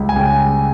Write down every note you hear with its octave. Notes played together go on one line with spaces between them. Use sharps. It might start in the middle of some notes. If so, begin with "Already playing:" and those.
Already playing: C#2 G3
G#5
C#3 G5